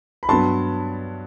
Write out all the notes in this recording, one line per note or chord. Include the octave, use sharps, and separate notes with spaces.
B5
G2 F#3 B3 A5 C6